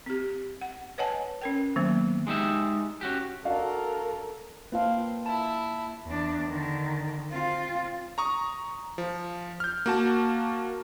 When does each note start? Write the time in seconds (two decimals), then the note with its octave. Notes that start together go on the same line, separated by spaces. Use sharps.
0.06 C4 G4
0.61 F#5
0.98 B4 C#5 D#5 F#5 G#5 A5
1.42 C#4 A#4 G5
1.76 D#3 F#3 A#3 B3
2.27 G#3 D#4 G4 E5
3.01 C#4 F#4 G4
3.45 D4 F#4 A4 A#4 F5
4.72 A#3 C4 F4 B4 F5 A5
5.26 E4 E5 A5
6.06 E2 D4
6.47 D3 D#3
7.31 C4 F4
8.18 A#5 C#6 D#6
8.98 F3
9.60 F6 G6
9.86 A#3 F#4 A5